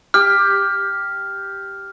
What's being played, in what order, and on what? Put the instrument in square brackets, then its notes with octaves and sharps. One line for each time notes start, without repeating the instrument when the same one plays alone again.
[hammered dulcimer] G4 [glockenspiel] F6